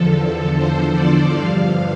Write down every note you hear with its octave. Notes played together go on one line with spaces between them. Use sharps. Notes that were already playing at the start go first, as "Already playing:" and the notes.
Already playing: E2 D3 F3 A4
C5
D5
G2 D3 F3 F5